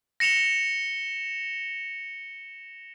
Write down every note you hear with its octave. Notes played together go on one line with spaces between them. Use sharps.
A#6 C#7 E7 F7 G7